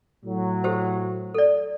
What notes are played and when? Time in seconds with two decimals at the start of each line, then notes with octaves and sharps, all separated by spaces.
0.25 A2 F#3
0.64 G4 A4 C5
1.35 A4 D5